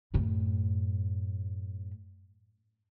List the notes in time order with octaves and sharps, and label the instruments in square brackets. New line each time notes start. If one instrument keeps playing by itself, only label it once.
[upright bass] F#2 A2